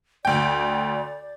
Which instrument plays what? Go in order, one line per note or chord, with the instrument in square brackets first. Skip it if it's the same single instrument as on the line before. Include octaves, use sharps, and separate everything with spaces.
[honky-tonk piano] D2 G5 [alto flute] D5